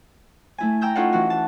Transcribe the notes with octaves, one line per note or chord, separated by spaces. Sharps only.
A3 E4 G#5
G5 A#5 E6 G6
C#4 D#4 F4 A4 D#5 F#5
E3 E4 F#4
A5